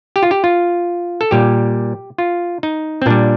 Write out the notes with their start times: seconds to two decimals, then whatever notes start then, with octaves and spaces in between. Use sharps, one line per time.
0.16 G4
0.23 F4
0.31 G4
0.44 F4
1.21 A4
1.31 A#2 G3 G4
2.18 F4
2.63 D#4
3.02 C4
3.06 A#2 G3 D4